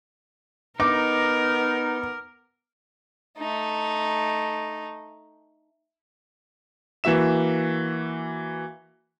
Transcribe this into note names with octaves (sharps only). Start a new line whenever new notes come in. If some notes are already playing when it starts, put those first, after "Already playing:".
B3 D#4 A#4 D6
A3 D#4
E3 A#3 F#4 E5 E7